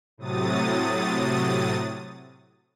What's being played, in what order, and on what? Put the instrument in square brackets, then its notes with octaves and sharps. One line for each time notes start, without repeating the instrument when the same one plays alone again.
[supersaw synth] A2 C3 F#3 D#6 A6